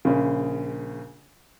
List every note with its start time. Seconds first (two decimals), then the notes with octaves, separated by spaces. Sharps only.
0.05 A#1 C#3